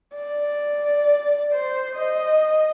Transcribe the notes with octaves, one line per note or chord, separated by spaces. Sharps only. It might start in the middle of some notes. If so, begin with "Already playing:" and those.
D5
C5
D#5